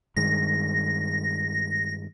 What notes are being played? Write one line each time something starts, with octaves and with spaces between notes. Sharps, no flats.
G2 D#3 G#3 A#6